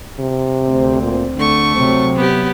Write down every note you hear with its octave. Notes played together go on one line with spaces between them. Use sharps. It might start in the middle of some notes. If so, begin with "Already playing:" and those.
C3
D2 C4
A#2
D3 A3 C#6
C3 F#3 C4
B3 G4